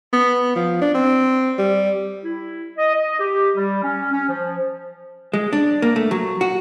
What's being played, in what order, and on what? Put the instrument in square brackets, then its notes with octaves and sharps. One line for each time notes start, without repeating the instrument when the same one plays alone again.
[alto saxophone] B3
F3
D4
C4
G3
[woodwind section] E4
D#5
D#5
G4
G3
C#4
C#4
F3
[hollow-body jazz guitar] G#3
D4
A#3
A3
F#3
F#4